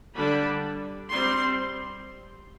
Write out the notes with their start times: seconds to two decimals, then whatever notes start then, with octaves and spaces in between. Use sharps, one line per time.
0.14 D3 G3 D4 B5
1.11 G3 C4 C6